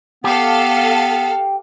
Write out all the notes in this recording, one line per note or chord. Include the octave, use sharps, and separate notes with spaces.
B3 G4 A4 F5